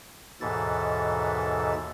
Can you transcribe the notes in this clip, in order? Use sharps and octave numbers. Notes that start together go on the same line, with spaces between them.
D#2 G#2 B2 E3 A4 A6